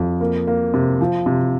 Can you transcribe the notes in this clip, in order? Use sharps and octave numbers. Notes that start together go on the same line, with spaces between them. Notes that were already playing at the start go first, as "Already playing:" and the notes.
Already playing: F2
A#3
A#3
C3
F3
C3